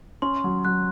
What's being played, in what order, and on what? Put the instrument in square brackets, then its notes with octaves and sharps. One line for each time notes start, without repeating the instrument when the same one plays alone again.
[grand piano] C#4 [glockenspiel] C6
[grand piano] F#3
[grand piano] F#3 [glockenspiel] F#6